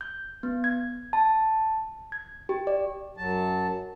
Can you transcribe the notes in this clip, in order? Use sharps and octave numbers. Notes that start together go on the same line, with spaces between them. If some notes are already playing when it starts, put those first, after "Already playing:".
G6
B3
G#6
A5
G#6
G4
D5
F#2 F#3 A5